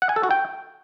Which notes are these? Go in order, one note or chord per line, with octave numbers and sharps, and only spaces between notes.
F#5
G#5
A4
F#4
G5